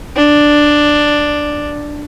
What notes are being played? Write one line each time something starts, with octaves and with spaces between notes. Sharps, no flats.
D4